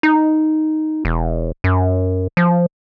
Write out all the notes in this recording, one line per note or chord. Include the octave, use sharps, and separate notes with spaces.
D#4
E1
F#2
F3